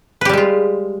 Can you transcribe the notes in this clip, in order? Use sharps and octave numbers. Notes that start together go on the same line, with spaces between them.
G3 G#3 F4 G4 B4